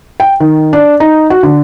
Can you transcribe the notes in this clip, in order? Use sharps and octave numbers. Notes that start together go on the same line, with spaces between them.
G5
D#3
D4
D#4
F#4
D3